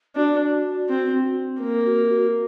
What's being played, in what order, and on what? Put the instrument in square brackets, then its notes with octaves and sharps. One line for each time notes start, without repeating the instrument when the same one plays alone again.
[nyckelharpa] D4 [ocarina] F#4
[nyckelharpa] C4
A#3
[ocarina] F#4
F#4